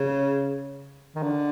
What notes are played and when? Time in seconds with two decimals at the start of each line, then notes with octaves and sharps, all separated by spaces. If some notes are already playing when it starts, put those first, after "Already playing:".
Already playing: C#3
1.16 D#3
1.23 D3